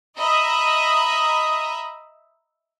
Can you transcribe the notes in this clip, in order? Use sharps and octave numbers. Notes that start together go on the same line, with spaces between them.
D#5 E5 A#5 B5 D#6